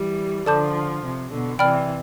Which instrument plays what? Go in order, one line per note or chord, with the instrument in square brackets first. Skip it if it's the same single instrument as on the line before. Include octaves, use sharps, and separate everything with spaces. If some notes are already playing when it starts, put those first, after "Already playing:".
Already playing: [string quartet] E3 G3
[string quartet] D3 F3 [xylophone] A4 D5 A5 D6 G6
[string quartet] C3
B2 D3
[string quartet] C3 E3 [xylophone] D5 G5 B5 F6